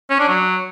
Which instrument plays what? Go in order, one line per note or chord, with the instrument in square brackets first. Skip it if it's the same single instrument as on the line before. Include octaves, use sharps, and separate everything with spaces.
[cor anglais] C#4
D4
F#3